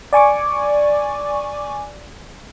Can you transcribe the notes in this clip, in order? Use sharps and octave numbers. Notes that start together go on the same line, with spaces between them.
D5 G#5 C#6 D6